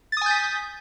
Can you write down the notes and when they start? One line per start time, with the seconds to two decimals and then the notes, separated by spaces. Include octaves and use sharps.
0.12 A6
0.17 D#6
0.21 G#5
0.26 G6
0.31 B6